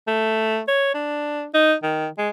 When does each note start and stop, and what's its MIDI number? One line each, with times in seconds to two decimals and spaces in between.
0.08 0.61 57
0.68 0.94 73
0.95 1.46 62
1.54 1.75 63
1.83 2.08 51
2.18 2.30 56